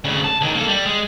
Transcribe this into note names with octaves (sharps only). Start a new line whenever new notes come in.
D2 C#3
A5
C#2 D#3
A#3 A4
G3
G#3